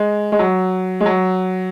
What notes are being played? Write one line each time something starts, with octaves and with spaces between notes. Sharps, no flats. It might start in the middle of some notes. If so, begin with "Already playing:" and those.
Already playing: G#3
G#3
F#3
G#3
F#3